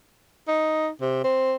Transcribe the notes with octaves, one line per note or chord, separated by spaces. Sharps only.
D#4
C3
C4